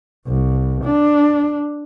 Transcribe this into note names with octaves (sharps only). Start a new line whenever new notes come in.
C2
D4